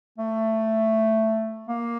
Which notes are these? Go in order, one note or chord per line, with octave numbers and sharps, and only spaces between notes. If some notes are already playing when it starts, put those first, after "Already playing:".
A3
A#3